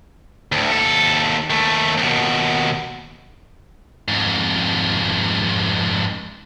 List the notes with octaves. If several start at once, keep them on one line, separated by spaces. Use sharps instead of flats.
D2 A2
D#2 A4
D#2 A3
D#2 B2
F2 G#2